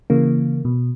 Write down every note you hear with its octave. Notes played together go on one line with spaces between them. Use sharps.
C#3 E3 A#3
B2